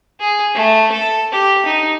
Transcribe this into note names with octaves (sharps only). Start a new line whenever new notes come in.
G#4
A3
A4
G4
D#4